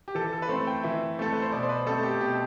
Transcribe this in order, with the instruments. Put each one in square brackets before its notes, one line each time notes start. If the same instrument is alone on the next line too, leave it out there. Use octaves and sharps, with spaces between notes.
[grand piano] G4
E3 A4
A4
B4
A3 C4 C5
G5
E3 E5
A3 C4 A4
B4
C5
B2 D5
C5
B4
A3 C4 A4
G4
B2 G4